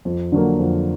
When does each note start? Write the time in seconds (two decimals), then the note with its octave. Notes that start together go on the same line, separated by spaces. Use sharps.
0.05 F2
0.32 D3 F#3 A#3
0.59 F2